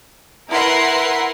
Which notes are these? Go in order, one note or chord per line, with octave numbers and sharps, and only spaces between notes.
E4 A#4 B4 F#5 C6